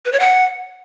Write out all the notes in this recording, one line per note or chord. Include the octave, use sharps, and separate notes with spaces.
B4
C#5
F#5